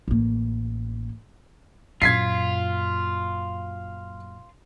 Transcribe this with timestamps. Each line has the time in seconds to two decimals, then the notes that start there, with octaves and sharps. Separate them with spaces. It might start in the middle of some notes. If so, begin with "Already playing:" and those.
0.08 A1 A#3
2.02 F#2 A#2 F4 G#6 B6 C7